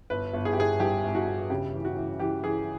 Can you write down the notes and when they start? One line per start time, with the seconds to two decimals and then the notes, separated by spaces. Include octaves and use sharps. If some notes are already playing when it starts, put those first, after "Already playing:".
0.10 G1 B4
0.33 G1
0.45 G#4
0.53 G4
0.57 G1 G#4
0.80 G2 G4
1.04 G1
1.15 F#4
1.27 G1
1.50 C#3 G4
1.73 E3
1.85 F#4
1.97 E3
2.19 E3 G4
2.43 E3 G#4